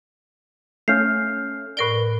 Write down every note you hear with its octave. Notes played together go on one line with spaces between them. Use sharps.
A3 C#4 F5 F6 G6 C7
A2 A#4 B4 D5 D7 G7